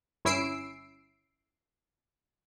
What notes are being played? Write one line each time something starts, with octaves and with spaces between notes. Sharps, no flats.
G1 C#4 E4 E6 C7 D7